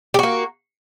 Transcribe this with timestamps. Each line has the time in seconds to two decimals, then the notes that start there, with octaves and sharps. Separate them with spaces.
0.14 G4
0.19 F#4
0.23 A#3